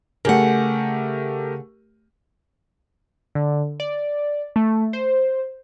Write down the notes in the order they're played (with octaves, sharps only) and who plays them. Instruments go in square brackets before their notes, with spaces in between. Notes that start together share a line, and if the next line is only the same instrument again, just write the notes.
[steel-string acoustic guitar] C#3 F#5 [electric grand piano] A3 G4 A#4
[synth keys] D3
D5
A3
C5